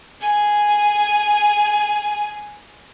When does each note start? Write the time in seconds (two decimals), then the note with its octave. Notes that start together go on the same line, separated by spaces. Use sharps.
0.21 G#4 G#5